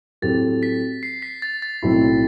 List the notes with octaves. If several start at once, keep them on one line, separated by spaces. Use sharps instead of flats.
A2 F#3 A3 C4 G4 A6
B6
C7
B6
A6
A6
B1 A2 F#3 C4 E4